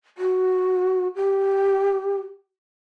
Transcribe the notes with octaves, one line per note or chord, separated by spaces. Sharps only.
F#4
G4